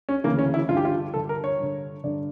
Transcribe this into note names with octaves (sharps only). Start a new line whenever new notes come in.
C#4
D2 C#3 E3 A#3
C#4
E4
G2 D3 F4
G4
F4
G2 D3 A4
A#4
C#5
G2 D3
G2 D3 D5